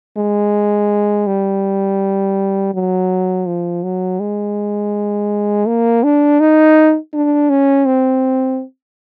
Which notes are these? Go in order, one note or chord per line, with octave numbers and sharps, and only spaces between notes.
G#3
G3
F#3
F3
F#3
G#3
A#3
D4
D#4
D4
C#4
C4